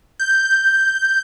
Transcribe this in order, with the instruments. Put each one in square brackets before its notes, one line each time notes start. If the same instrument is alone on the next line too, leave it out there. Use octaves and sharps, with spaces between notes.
[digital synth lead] G6